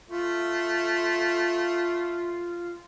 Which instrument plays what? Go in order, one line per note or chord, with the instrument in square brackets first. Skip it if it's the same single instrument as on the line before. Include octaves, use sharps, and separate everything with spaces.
[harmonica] A3 [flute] F4